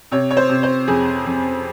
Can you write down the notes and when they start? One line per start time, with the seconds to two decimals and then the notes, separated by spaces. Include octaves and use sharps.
0.12 C3 C#5
0.31 C#5
0.37 C5
0.49 C3
0.63 C5
0.88 F2 G#4
1.26 F2